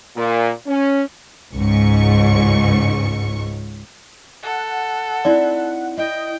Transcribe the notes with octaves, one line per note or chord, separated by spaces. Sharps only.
A#2
C#4
C#2 G#2 C#6
A4 F#5
C4 D#4 E4 D5
E4 D#5 G5